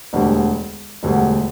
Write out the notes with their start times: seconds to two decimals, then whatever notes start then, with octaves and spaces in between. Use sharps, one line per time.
0.13 E1 D2 D3 G3
1.03 E1 D2 D3 G3